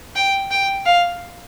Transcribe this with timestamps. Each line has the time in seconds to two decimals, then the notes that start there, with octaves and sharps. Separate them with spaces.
0.16 G5
0.51 G5
0.86 F5